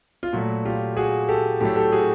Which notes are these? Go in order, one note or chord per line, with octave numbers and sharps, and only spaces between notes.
F4
A#2 F#3 A3 F#4
F4 G4
F#4 G#4
G4 A4
A2 F#3 A3 G4 A4
G4 A4
F#4 G#4